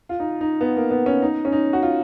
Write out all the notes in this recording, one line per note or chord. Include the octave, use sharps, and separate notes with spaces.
F4
D#4
D#4
B3
A#3
B3
C#4
D#4
C#4
D#4
F#4
F4